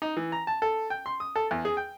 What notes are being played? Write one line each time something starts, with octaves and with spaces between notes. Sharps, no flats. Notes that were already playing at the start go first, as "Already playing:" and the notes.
D#4
E3
A#5
A5
A4
G5
C6
D#6
A4
E2
G#4
G5